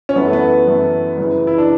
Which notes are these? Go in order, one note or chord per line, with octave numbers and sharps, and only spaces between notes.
C#4
F#2 E3 A3 B3
A3
B3
F#2 E3 A3
F#2 C#3 E3
E4
D4